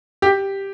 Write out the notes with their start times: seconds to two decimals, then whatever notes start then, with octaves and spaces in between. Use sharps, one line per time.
0.22 G4